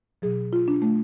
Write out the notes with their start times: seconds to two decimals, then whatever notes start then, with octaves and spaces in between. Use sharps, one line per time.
0.22 B2 F#3 G#4
0.53 F4
0.68 D4
0.82 A3